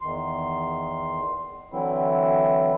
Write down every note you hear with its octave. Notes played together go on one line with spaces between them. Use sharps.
E2 D#3 C6
D3 E3 F#3 C4 E4